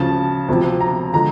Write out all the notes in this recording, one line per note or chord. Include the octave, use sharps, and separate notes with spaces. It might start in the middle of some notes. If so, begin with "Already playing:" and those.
Already playing: D2 C#3 F3 A5
D2 C3 F3
A#5
D3 F3 G#3 A#5